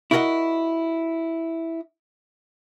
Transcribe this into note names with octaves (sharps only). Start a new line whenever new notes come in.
E4 F#4 A#4 D5 D#5 F#5